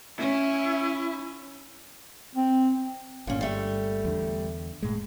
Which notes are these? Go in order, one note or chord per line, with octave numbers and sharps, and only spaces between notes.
C#4 E4
C4
G1 A#2 C#4
G3 A3
E2 D3
F1 A2 G#3